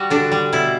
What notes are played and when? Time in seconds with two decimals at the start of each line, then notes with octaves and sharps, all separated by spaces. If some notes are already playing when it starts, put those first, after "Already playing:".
Already playing: G3 F#4
0.10 D3 D4
0.32 G3
0.53 B2 E4